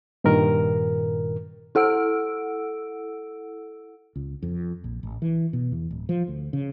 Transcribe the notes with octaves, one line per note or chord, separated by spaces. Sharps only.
G2 A#2 D#3 A#4
E4 A4 F#5 E6 D7
C#2
F2
A#1
A1
E3
B2
E2
D1
F3
D2
C#3